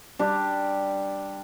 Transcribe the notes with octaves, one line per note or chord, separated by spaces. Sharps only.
G3 D4 G4